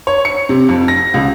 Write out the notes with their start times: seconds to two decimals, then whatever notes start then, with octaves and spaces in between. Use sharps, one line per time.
0.07 C#5
0.25 C#7
0.49 C3
0.69 F2
0.88 A#6
1.14 C#2